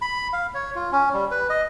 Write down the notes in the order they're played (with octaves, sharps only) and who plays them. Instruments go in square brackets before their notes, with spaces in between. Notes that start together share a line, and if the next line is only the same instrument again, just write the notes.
[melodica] B5
F5
C#5
F4
C#4
G3
B4
D#5